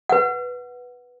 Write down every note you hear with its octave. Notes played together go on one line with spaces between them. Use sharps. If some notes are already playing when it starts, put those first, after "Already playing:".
B4 F#5